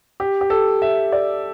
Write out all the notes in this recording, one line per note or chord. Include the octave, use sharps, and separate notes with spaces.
G4
G4
A4
E5
D5